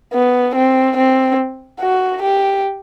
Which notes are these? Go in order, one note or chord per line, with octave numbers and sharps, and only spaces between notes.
B3
C4
C4
F#4
G4